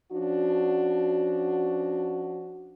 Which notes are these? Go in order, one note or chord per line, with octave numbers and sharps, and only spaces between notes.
F3 C#4 D4 F#4